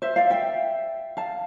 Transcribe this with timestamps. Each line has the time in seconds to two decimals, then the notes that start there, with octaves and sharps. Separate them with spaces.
0.02 C5 E5
0.16 D5 F5
0.30 E5 G5
1.17 F5 A5